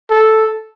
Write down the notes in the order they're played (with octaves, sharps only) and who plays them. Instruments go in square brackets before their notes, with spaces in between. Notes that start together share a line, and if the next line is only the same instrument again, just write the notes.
[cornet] A4